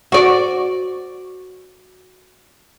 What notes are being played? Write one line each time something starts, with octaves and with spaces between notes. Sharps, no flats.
F#4 D5